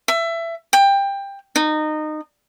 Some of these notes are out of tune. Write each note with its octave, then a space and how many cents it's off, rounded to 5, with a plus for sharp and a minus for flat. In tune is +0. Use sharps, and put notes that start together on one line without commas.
E5 +20
G5 +20
D#4 -20